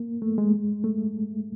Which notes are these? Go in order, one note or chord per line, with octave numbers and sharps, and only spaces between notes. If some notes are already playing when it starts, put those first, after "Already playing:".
Already playing: A#3
A3
G#3
A3